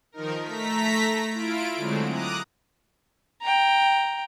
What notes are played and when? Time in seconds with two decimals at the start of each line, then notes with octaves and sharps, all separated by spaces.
0.12 D#3 F3 D#4 A#4
0.42 A3 A#5 B6
1.31 E4 F4 D7
1.76 D3 F#3 G#3 A3 C4
2.09 A#5 D6 D#6 F#6
3.42 G5 A#5